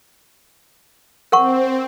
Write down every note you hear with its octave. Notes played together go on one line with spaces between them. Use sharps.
C4 A#4 F#5 C#6